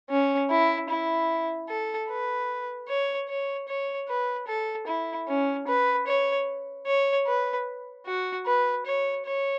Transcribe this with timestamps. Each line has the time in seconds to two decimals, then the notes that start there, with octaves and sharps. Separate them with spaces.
0.10 C#4
0.50 E4
0.89 E4
1.69 A4
2.09 B4
2.88 C#5
3.29 C#5
3.68 C#5
4.08 B4
4.47 A4
4.87 E4
5.28 C#4
5.67 B4
6.07 C#5
6.86 C#5
7.27 B4
8.06 F#4
8.46 B4
8.86 C#5
9.26 C#5